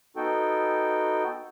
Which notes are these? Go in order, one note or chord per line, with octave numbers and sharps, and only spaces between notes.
B3 D#4 F#4 A4 G5